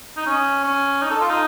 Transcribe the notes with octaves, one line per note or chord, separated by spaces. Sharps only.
D#4
C#4
C#4
D#4
A4
F4
D#4